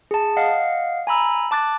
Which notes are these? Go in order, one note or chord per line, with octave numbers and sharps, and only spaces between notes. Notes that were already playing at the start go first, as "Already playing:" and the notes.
G#4 A5
D#5 F5 F#5
G#5 A#5 B5 E6
A5 D6 F#6 A6